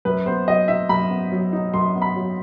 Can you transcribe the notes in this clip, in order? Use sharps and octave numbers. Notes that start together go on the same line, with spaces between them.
F#2 B4
B3 C5
F#3 D#5
D#4 E5
F#2 B5
B3
F#3
D#4
F#2 C6
B3
B5
F#3